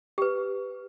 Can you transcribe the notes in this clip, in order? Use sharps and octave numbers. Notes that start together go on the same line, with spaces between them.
G4 B4